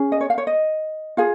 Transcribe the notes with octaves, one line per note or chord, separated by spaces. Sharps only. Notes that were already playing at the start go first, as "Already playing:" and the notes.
Already playing: C#4 G#4
D#5
C#5
F5
C#5
D#5
F4 G#4 F5